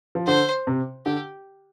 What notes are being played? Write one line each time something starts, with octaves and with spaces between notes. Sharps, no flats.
F3
D3 C5
C3
D3 G4